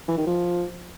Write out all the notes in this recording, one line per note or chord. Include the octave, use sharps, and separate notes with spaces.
E3
D#3
F3